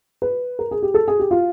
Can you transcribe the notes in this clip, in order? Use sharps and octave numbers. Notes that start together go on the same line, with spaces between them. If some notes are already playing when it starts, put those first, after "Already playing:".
B4
A#4
G#4
G4
A4
G#4
G4
F4